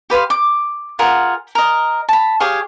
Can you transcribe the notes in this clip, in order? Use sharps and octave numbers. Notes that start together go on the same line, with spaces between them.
G4 B4 F5 C6
D6
F4 G#4 A#4 F#5
A#4 D#5
A5 B5
G4 G#4 C#5 F5